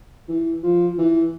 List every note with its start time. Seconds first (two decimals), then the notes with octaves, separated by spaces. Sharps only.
0.28 E3
0.63 F3
0.98 E3